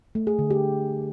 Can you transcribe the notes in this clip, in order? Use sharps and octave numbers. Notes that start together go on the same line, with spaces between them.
A3
G#4
D3
G4